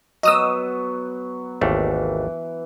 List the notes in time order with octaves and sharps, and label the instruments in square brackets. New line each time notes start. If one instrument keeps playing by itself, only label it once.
[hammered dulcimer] F#3 B3 [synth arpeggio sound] D#5 D#6 E6
[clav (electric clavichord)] G#1 D#2 A3 [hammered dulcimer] E3